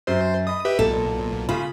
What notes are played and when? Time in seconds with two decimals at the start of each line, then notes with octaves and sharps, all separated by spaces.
0.07 F#2 C5
0.47 D#5 B5 D#6
0.65 G4 B4 E5
0.79 B1 A#2 A4
1.49 C#3 F4 B5